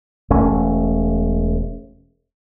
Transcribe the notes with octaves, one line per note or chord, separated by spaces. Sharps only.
E1 A3 C#4